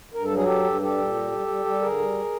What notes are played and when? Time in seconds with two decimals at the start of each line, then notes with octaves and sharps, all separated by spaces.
0.14 G2 A#4
0.24 A4
0.30 F#3 G#4
0.44 G2 G4 A4
0.64 G2
0.81 G3 G4 A4
0.98 A#2
1.14 G3
1.31 G3
1.47 G3
1.65 G3
1.81 D3 G#4 A#4
1.98 G3